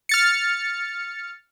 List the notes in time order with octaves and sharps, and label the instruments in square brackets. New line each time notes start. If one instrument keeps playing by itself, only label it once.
[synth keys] F6 A6 C#7